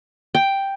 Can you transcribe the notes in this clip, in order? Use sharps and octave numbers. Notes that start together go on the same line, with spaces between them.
G5